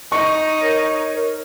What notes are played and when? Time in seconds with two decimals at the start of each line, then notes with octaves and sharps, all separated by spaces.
0.12 D#4 C#6
0.62 A#4 C#5